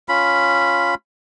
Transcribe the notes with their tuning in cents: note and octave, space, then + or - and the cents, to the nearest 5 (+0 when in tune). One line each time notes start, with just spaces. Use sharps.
C#4 +0 F4 +0 B5 +0